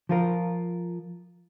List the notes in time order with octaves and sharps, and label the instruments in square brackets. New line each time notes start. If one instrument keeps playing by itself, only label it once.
[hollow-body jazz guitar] F3 F4 A#4